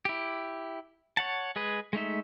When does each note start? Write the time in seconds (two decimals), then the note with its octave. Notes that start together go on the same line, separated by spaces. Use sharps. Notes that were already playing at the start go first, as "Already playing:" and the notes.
0.05 E4 G4
1.17 C#5 F#5 A5
1.56 G#3 G#4 B4
1.93 G#3 A3 D#4 E5